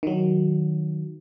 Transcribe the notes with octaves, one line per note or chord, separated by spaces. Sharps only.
D#3 F#3